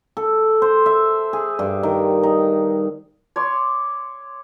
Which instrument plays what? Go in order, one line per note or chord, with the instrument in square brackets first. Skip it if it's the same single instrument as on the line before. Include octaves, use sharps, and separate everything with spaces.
[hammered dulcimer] A4
C5
E5
G#4
G2
D#3
D#4
[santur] C#5 C6 D6